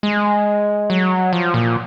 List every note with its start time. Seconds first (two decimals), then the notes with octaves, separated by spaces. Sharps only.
0.03 G#3
0.90 F#3
1.33 F3
1.54 A#2